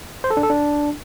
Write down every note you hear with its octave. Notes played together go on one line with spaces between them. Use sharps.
C5
A4
D4
A4
D4